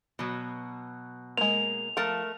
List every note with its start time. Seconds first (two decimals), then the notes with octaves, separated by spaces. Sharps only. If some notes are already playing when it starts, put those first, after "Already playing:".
0.19 B2 F#3
1.37 G#3 A#3 F7
1.97 F3 A3 A#4 A5